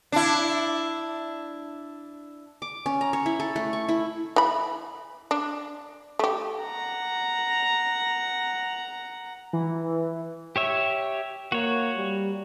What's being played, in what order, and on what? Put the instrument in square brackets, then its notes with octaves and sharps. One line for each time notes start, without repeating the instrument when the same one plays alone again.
[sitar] D4 E4
[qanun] D6
C#4
A#5
C#5
E4
A4
A3
C#6
E4
[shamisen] E3 B5
D4
A3 G4
[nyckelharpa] F#5 A#5
[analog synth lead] E3
[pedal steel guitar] G4 C#5 E5
[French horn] A#3 [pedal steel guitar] F#4 C#5
[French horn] G3